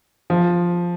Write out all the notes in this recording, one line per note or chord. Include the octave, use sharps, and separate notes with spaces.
F3